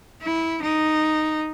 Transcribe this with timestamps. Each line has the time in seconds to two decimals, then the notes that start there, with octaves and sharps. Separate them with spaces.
0.22 E4
0.63 D#4